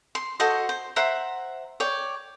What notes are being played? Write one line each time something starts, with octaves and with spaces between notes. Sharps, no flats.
C6
F#4 A4 C5 D#5
C5
C5 E5 F#5 A#5
C#5 D5 G5